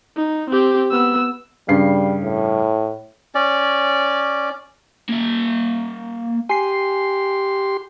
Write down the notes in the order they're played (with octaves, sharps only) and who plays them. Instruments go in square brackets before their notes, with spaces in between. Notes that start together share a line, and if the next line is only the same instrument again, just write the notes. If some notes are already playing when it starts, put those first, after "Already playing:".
[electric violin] D#4
C4 G4
B3 E6
[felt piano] G2 C#3 C7 [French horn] G3
[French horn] A2
[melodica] C#4 D5
[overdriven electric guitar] A#3 E5
[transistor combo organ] G4 C6 [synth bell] G#5 C7